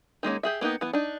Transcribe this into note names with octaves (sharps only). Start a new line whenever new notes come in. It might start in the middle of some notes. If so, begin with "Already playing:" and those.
D#3 G#3 A#3 C#4
G4 G#4 E5
A#3 B3 D#4 G4
E3 B3
D4 D#4